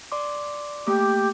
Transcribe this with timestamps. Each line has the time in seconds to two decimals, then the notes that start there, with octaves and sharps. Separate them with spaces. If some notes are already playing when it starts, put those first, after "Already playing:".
0.12 D5 C6 D6
0.87 A3 A#3 G4 D6